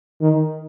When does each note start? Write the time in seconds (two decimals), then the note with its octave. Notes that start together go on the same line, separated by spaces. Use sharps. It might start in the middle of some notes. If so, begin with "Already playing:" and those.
0.21 D#3